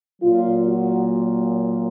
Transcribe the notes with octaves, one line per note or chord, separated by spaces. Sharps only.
A#2 F#3 F4
F#4